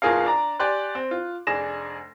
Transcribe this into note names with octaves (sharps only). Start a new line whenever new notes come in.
F#1 B2 F4 G#4 A#4 F5
D4 D5 A#5
G4 D5 G#5 C6 F#6
C4
F4
F1 D4 G#4 A#6 E7